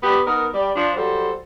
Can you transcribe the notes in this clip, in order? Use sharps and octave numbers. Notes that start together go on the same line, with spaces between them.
G3 B3 G4
B3 D#4 A#4
G3 D5
F3 D4
F#3 G3 A4 C5